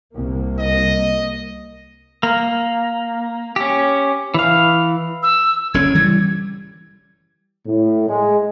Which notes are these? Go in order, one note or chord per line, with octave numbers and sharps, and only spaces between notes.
C2 A#3
D#5
A#3
C#4 G4
E3 F5
E6
F#1 D3 C#4 G#6
E3 G3
A2
G#3